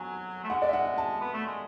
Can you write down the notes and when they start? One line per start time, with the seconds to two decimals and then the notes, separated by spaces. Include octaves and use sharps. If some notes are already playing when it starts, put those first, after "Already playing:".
Already playing: F#3 G#5
0.44 A3
0.49 G#3 F#5
0.62 D5
0.69 E5
0.73 F#5
0.86 F#5
0.98 A5
1.21 B3
1.33 A3
1.46 G#3